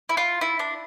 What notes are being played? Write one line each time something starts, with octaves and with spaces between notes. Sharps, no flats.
E4
F4
E4
D4